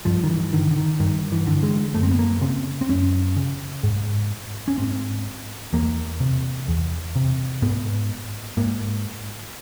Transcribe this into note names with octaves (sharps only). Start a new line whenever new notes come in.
G2 F3
D#3
E3
D3 D#3
D3
D#3
G2 D#3
E3
D3
G#3
F#2 A3
C4
B3
A#3
C#3 C4
C4
F#2 C#4
C#3
G#2
C#4
G#2 C4
E2 A#3
C3
E2
C3
G#2 B3
G#2 A#3